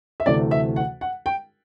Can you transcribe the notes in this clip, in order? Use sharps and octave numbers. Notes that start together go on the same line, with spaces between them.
E5
D2 C3 E3 A3 D5
E5
F#5
F#5
G5